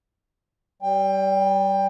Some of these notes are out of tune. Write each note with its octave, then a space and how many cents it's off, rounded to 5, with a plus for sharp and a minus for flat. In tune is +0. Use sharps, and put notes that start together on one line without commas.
G3 -30 G5 +20